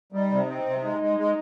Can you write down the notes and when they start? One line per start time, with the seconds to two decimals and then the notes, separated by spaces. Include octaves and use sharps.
0.12 G3 D#4
0.31 C3
0.48 C4 D#4
0.66 C3
0.82 G#3 D#4
1.01 G#3
1.18 G#3